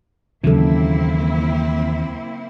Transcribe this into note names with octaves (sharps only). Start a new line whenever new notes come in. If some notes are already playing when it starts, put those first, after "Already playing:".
D#2 C#3 E3 F#3 A#3 C4 E4 A4